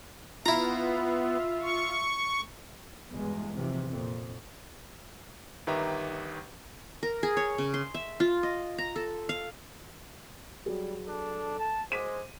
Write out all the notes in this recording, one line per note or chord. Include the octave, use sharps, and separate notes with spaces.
B3 E4 F4 E5 A#5
C#6
E2 G2 B2 G#3
G#2 C3 E3 F3
F2 A#2
G1 D#3 G4 B4 E5 A#5
A#4
G#4
C#5
C#3
C6
E5
F4
D#5
A#5
A4
F5
F#3 G3 G#4
D4 A4
A5
G#3 C5 D6 B6 D#7